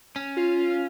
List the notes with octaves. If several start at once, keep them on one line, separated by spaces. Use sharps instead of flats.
C#4
F4